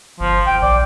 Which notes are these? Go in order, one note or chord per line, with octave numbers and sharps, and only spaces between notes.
G1 F3
G#1 G5
A#1 D5